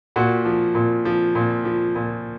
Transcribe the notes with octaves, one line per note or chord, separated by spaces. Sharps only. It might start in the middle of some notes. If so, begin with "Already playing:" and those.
A#2 F#4
F3
A#2
F3
A#2
F3
A#2